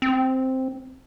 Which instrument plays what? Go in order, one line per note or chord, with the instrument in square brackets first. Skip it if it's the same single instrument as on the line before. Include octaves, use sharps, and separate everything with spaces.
[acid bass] C4